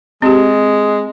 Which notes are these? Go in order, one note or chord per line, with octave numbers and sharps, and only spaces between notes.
G#3 C4 G4